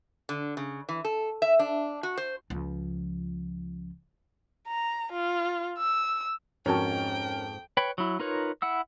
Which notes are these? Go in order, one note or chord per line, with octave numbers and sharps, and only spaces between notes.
D3
C#3
E3
A4
E5
D4
F#4
C5
C#2 F3
A#5
F4
E6
F2 G#2 C#4 F#4 A#4 G5 A5
B4 C#5 G5 B5
F#3 E4
D#4 F4 A#4 B4 C#5
E4 F#5 E6